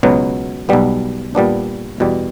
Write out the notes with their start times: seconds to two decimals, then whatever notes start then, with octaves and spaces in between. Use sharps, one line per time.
0.03 C#2 B2 F#3 B3
0.69 B1 B2 G3 B3
1.35 A#2 G3 B3 D4
2.00 E2 B2 G3